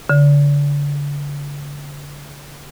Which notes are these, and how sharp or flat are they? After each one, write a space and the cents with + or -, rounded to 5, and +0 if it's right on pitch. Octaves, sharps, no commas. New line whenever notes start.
D3 -35